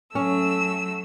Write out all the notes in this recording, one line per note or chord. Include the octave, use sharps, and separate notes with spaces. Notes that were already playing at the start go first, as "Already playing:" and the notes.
F#3 A3 C#4 E6